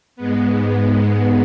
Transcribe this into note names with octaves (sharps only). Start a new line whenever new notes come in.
G#2 G#3 B3